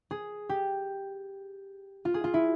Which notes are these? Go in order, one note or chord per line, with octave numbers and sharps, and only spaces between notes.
G#4
G4
F4
G#4
F4
E4